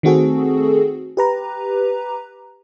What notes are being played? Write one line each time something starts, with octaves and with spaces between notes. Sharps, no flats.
D#3 A3 C4 F#4 G#4 A4
G4 B4 A#5